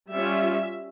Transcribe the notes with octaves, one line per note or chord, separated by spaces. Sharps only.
G3 C#4 F4 E5